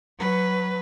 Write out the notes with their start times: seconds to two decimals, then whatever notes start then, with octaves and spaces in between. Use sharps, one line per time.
0.18 F#3 B4